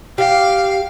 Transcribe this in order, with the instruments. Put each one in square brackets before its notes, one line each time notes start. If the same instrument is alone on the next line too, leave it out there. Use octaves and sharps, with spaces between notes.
[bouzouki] G4 [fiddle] F5